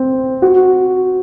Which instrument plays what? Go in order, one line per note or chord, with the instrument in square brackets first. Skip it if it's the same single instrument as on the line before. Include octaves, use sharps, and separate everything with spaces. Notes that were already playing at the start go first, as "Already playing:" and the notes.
Already playing: [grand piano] C4
F#4